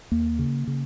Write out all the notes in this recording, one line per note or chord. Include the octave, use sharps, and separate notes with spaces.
D#2 A#3
C#3
C#3